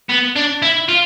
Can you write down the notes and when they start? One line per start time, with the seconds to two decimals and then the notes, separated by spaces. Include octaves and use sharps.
0.10 B3
0.36 D4
0.62 E4
0.89 F4